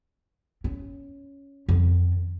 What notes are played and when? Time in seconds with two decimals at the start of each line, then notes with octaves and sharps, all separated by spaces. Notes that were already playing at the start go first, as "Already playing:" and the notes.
0.64 C#4
1.69 F2 D#3